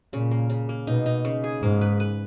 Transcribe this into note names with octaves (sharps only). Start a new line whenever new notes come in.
A#2 C#3
A#3
C#3
A#3
B2 D#4
D#4
C#3
G#4
G#2 A#3
B4
B4